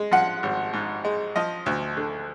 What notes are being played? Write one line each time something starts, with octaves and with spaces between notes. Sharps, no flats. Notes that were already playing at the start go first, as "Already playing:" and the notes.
Already playing: G#3
F3 F#5
G#1
G#2
G#3
F3 D#5
D2
D3